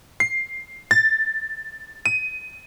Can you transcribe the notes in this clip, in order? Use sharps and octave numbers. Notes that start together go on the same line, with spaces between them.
C7
A6
D#7